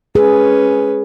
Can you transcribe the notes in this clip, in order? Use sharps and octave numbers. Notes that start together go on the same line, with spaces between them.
C#4 G#4 B4